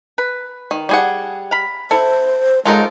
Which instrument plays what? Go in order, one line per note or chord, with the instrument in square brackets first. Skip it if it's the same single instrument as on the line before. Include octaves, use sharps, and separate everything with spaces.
[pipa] B4
[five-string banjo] D#3
G3 G#4 F#5
[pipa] F5 B5
[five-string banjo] E4 [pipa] A4 [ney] C5
[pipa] F3 F#3 D#4 [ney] G#3 [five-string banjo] F4 A4 A#4